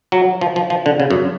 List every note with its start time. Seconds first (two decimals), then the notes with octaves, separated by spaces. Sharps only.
0.12 F#3
0.41 F3
0.56 F3
0.70 F3
0.86 D3
1.00 C#3
1.10 F#2